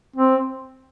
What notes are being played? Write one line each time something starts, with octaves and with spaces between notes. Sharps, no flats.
C4